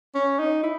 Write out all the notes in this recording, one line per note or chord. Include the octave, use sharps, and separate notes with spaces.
C#4
D#4
E4